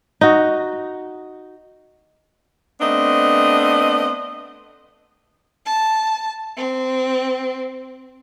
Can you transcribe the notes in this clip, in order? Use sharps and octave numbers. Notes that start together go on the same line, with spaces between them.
D#4 F#4
A3 B3 C4 D4 D#5
A5
C4